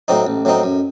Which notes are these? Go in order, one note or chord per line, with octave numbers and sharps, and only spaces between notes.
A2 F#3 C4 D#4
A1
A2 F#3 C4 D#4
F#2